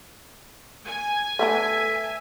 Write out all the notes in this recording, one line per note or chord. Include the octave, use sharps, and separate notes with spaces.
G#5
A3 B3 D4 A4 E5